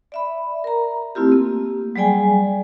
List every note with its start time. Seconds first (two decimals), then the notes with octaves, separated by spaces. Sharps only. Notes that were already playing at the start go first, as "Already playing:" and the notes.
0.12 D5 E5 B5
0.64 A#4 A#5
1.15 A3 C4 E4 F4 G4
1.32 A#3
1.96 F#3 G3 G#4 D5 G5 G#5